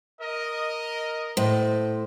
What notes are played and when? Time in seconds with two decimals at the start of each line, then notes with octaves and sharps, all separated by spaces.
0.21 A#4 D#5
1.37 A2 C5